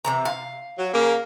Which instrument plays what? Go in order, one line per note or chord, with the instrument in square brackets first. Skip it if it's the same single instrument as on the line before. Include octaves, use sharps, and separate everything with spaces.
[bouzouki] C3 E3 A#5
F5
[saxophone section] F#3
C#3 A#3